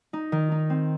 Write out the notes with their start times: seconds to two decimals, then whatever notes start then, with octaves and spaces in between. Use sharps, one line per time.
0.13 D#4
0.32 D#3
0.52 D#4
0.70 C4